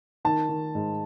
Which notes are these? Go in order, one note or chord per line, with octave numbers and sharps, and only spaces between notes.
D#3 A5
D#3
G#2